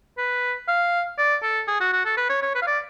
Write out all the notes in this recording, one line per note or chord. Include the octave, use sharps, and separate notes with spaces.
B4
F5
D5
A4
G#4
F#4
F#4
A4
B4
C#5
C#5
B4
F5
D5